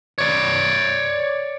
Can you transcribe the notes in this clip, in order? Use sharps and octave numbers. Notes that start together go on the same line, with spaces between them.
C#5 D5